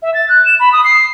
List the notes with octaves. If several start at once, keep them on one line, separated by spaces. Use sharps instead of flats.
E5
A6
F#6
E7
B5
D#6
C7